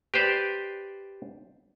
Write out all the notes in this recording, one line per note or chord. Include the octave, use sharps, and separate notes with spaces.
G4 B4 C5 D5